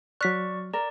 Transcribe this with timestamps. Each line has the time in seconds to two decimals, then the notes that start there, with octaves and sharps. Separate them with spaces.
0.21 F#3 D5 C#6 F6 F#6 B6
0.73 A#4 D5